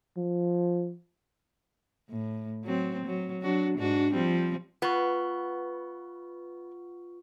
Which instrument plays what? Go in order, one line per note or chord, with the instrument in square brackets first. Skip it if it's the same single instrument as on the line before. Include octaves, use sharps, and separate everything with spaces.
[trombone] F3
[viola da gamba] A2
F#3 C4
F#3
F#3 D4 F#4
G#2 D4 F#4
F3 G3 C4
[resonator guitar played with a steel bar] B3 [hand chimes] F4 B4 C#6